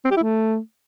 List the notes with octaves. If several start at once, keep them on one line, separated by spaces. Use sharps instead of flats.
C4
G4
E4
A3